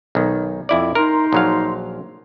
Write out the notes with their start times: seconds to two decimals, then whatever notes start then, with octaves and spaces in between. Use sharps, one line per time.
0.15 B1 D#3
0.69 F2 E4 D5
0.95 D#4 A#4 C6
1.33 A#1 F#3 F5